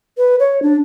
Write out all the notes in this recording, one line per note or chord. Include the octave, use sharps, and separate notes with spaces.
B4
C#5
D4